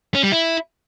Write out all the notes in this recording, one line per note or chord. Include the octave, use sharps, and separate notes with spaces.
C#4
G3
E4